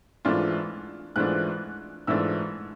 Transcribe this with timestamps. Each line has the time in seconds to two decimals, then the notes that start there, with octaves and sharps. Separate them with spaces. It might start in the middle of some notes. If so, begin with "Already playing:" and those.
0.25 G#2 E3 A3 D4 F4
1.16 G#2 E3 A3 D4 F4 F#6
2.07 G#2 E3 A3 D4 F4 E6